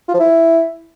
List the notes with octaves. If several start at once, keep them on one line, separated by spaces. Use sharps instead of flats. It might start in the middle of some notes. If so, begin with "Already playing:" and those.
F4
F3
E4